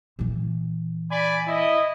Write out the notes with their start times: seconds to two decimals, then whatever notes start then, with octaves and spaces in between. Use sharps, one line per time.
0.19 A#2 E3
1.11 D5 G#5 B5
1.48 E4 D#5